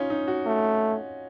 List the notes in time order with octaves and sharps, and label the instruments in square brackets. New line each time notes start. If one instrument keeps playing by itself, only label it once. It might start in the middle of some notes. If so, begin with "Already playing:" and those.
Already playing: [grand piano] C#4 D#4 F4
D#4
F#4
[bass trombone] A3